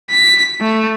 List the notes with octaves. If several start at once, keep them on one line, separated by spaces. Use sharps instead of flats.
B6
A3